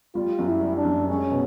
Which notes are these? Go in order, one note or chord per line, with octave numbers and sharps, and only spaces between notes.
G3 F4
F#2
E4
G3
D4
F#2
G#3 C#4
B2